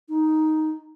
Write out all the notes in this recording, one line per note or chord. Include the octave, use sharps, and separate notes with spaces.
D#4